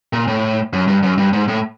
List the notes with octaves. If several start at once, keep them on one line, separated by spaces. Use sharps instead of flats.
A#2
A2
F#2
G2
F#2
G2
G#2
A2